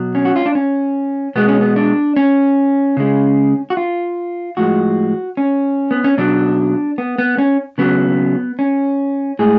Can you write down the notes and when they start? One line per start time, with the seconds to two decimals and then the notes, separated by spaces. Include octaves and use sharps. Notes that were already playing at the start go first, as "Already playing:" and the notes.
Already playing: B2 F#3
0.15 C#4
0.25 F#4
0.36 F4
0.46 D4
0.55 C#4
1.36 B2 G#3 B3
1.48 C#4
1.61 B3
1.76 D4
2.16 C#4
2.97 C#3 G#3
3.70 F#4
3.77 F4
4.57 A2 F3 G#3 F#4
5.37 C#4
5.91 B3
6.04 C#4
6.18 B2 F#3 D4
6.98 B3
7.18 B3
7.38 C#4
7.78 C#3 F#3 B3
8.59 C#4
9.39 A2 G#3 G#4